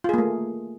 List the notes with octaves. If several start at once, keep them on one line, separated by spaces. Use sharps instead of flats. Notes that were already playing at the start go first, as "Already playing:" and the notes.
A3 A#3 F4 G#4